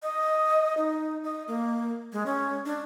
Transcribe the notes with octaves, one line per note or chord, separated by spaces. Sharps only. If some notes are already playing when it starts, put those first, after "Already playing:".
D#5
D#4
D#5
A#3
G#3
C#4
D4